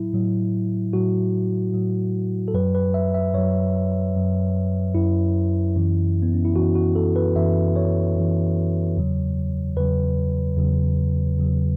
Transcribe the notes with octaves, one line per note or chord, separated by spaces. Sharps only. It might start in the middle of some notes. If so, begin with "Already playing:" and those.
Already playing: A2 F#3 E4
A2 F#3
A2 F#3 F#4
A2 F#3
A4
F#2 F#3 B4
B4
E5
E5
F#2 F#3 C#5
F#2 F#3
F#2 F#3 E4
F#2 E3
B3
C#4
E4
F#2 E3 F#4
F#4
A4
B4
F#2 E3 E5
C#5
F#2 E3
E2 C#3 F#3
E2 C#3 F#3 B4
E2 C#3 F#3
E2 C#3 F#3